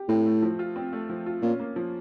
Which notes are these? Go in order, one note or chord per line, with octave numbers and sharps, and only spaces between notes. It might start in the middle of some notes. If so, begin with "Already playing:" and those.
Already playing: G4
A2 C4
A3
F3
F4
C4
A3
F3
F4
A#2 C#4
A#3
F3